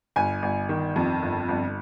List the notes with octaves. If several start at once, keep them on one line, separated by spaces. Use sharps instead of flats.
G1 G#5
G1
D#3
F2
G1
G1